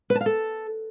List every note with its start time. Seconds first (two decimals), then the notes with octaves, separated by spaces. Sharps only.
0.10 B4
0.15 A5
0.21 F5
0.26 A4